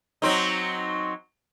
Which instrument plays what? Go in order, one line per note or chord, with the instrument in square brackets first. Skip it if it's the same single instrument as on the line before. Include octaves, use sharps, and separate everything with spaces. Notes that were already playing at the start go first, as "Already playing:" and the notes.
[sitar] F#3 C4 D#4